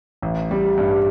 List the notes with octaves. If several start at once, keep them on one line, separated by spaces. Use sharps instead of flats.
A1
G3
G2